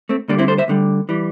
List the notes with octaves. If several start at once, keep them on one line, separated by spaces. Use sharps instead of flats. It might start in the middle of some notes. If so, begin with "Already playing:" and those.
A3 C4
D2 D3 G3 A#3 D4
C4 E4
A4 C5
C5 E5
D2 D3 G3
E3 G3